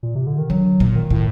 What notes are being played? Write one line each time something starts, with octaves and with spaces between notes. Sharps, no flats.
A#2
C3
D3
D#3
D3 F#3
A#2
D#3
A2